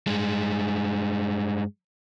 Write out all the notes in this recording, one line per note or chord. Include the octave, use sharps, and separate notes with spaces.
G2 G#3